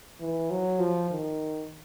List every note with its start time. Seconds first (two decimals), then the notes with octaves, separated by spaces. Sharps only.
0.21 E3
0.51 F#3
0.80 F3
1.10 D#3